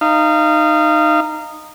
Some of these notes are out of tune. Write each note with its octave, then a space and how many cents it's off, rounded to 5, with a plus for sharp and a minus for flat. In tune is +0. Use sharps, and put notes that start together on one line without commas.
D#4 -15 F5 -25